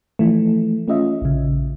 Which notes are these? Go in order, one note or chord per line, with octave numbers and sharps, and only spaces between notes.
E3 F3 A3
A3 C#4 F4 D#5 E5
A#1 C#3